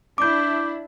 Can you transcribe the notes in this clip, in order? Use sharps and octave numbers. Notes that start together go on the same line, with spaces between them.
D4 E4 D6 G6